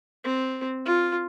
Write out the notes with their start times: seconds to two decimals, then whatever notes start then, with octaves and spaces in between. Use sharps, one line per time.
0.24 C4
0.86 F4